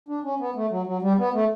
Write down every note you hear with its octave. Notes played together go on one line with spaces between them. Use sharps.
D4
C#4
B3
A3
F#3
F#3
G3
B3
A3